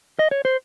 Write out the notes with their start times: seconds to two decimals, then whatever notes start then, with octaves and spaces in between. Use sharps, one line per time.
0.19 D#5
0.31 C#5
0.45 C5